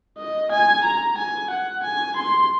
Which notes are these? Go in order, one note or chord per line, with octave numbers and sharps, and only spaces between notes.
D#5
G#5
A#5
G#5
F#5
G#5
C6